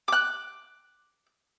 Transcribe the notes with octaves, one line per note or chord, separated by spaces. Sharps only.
D6 F#6